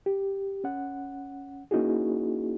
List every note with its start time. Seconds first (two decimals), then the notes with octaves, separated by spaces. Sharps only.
0.06 G4
0.64 C#4 F#5
1.71 A#3 C#4 D#4 E4 F#4 G#4